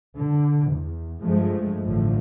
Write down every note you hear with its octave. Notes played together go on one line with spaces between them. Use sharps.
D3
E2
G2 F3 G#3 A3
A1 A2 D3 F3